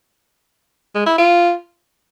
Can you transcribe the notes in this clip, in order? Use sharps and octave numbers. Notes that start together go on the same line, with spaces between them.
G#3
E4
F4